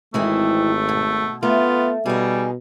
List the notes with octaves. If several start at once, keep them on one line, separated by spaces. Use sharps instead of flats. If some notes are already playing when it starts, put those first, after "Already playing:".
G#1 E3 G#3 A3 C4
B2
A3 B3 F4
B2 G3 D#4 G#4